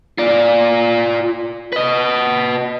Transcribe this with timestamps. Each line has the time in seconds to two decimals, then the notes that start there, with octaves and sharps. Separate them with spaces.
0.18 F4 D5
1.73 B4 D#5